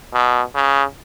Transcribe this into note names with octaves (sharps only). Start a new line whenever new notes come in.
B2
C#3